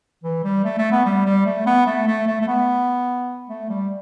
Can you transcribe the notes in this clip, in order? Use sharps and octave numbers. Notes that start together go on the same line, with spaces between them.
E3
G3
A3
A3
B3
G3
G3
A3
B3
A3
A3
A3
A3
B3
A3
G3